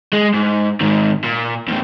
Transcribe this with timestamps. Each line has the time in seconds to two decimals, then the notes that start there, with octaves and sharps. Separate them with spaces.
0.13 G#3
0.34 G#2
0.81 G#2 D#3
1.24 A#2
1.68 E2 A2